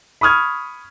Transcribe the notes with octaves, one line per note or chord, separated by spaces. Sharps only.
B5 C#6 D#6 F6 G#6